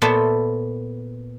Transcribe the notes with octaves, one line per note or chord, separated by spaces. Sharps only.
A#2 B3 A4 C5 C#5 E5